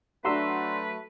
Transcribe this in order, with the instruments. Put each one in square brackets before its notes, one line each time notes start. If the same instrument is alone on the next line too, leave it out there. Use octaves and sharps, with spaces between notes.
[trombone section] F#3 A3 [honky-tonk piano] D4 F#4 [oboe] B4 [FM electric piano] A#5 C6 E6